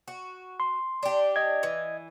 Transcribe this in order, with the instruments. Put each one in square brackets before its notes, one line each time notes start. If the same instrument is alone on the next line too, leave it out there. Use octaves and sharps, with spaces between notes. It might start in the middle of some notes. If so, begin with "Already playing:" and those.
[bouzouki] F#4
[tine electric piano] C6
[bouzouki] D4 G4
[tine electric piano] D#5 G#6
[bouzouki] E3